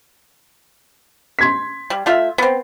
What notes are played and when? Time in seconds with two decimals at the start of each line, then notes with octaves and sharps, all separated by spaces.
1.39 C6 G#6 B6
1.90 G3
2.06 A3 F4 E5
2.38 B3 C4